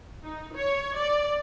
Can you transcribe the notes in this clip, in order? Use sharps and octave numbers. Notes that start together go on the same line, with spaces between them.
D#4
C#5
D5